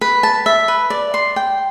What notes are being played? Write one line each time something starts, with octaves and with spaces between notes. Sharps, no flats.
B4
A5
E5
B4
D5
C6
G5